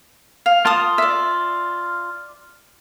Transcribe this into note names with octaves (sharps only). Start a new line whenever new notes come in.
F5
F4 A5 D#6
D5 E5